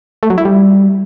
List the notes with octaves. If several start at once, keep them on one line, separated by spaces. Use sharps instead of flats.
A3
F#3
E4
G3